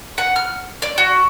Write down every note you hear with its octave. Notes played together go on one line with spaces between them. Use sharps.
F#5
F6
D5
F#4